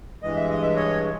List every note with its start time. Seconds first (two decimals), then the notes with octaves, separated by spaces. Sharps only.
0.23 G2 E3 G#3 D#5
0.36 E5
0.49 D#5
0.63 E5
0.76 C#5 D#5